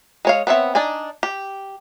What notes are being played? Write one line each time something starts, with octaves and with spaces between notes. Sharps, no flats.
G#3 C#5 F5
B3 C4 C#5 E5
D4 D#4 D5 G#5
G4